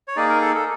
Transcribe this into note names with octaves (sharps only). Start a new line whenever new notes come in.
C#5
A#3 D#4 G#4 D5
A#4
A4
A4